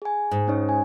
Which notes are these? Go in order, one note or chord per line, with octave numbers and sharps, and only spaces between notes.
G#4 G#5
G#2
C#4 D#4 C#5
G#5